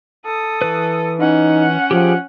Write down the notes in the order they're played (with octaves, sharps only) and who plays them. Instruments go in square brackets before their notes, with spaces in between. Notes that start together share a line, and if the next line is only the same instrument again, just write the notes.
[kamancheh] A4 D#6
[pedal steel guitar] E3 B4
[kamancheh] C#4 F#5 [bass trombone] D#4
[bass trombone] F3 [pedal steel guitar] G4 G#4 G5